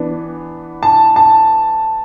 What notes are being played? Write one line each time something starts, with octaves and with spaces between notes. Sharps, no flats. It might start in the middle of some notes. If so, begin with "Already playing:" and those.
Already playing: E3 B3 D4
A5
A5